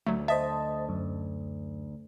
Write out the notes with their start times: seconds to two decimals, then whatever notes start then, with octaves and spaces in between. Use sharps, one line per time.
0.07 D2 F#3 A3
0.28 C5 D#5 E5 A5
0.89 F#2